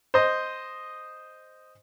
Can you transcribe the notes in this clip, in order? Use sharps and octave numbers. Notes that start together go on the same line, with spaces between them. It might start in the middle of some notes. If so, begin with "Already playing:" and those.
C5 D#5